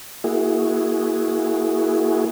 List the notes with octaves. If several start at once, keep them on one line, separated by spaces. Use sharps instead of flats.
A#3 E4 F#4 G#4